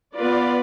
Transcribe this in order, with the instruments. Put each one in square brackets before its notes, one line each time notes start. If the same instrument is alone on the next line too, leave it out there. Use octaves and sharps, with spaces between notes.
[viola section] B3 F4 B4 D5